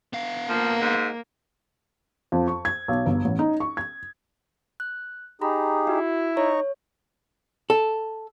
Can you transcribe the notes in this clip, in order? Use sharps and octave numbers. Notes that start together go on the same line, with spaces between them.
B3 F5
F3 A#3
G#2
F2
C#6
G#6
B1
G1
A1
D#4
C#6
G#6
F#6
D#4 G4 G#4 A#5 B5
E4 F#4
D#4 C#5 A#5 C#6
A4